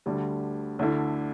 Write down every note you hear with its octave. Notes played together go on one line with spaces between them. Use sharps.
D2 D3 G3
D2 D3 A3 E4